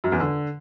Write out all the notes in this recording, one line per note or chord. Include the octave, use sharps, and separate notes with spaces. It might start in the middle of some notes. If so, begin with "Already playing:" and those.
F#2
E2
D3